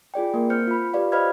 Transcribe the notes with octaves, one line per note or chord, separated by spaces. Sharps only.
F4 G#4 D5 G5
A#3 A#4
C4 C5 F6 G6 C#7
F4 B5
F4 G4 B4 D5 F5
C5 D#5 F5 B5 F6 G#6